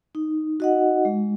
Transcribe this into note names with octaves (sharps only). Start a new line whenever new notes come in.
D#4
F#4 D#5 F#5
G#3